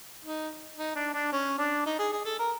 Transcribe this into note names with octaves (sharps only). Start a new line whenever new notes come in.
D#4
D#4
D4
D4
C#4
D4
D#4
G#4
G#4
A4
A#4